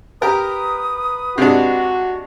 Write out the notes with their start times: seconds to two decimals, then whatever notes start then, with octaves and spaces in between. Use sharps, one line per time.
0.22 G4 A#4 B4 D#6
1.38 C3 G#3 D4 F#4